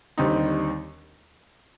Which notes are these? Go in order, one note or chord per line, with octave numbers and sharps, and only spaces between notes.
D#2 D3 G3 C4 D#4